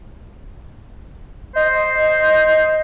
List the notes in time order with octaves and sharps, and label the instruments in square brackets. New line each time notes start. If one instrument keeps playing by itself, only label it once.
[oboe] C5 [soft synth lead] D#5